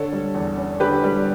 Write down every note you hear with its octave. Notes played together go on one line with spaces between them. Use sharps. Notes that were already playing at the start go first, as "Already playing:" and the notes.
Already playing: D3 A4 C#5
G3
E2
C#4
D3 G4 B4
G3